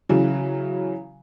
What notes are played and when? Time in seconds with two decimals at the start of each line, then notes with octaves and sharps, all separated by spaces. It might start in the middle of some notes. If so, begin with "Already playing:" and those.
0.09 C#3 E3 F#3